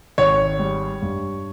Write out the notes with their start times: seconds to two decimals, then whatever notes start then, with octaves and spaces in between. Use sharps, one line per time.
0.18 G#1 C#5
0.59 G3
1.02 G2